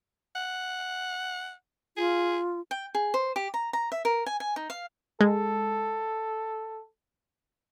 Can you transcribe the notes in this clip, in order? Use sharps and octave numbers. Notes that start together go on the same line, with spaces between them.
F#5
F4 G#4
G5
G#4
C5
G4
A#5
A#5
E5
A#4
G#5
G#5
D#4
F5
G#3 A4